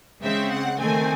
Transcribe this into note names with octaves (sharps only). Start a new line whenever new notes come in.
C#3 G#3 C4 E5
F#5
D#3 A3 C4 G#5